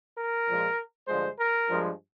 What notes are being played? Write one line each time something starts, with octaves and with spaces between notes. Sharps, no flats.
A#4
A#2 F3 G#3
G2 D3 F3 G#3 C5
A#4
G2 F3 G#3